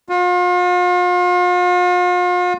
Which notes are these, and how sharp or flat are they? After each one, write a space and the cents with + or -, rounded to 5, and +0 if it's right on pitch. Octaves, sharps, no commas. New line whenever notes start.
F4 +40